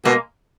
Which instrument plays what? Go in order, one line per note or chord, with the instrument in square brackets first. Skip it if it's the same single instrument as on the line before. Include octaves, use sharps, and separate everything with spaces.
[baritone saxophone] B2 [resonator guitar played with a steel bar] G#3 A#3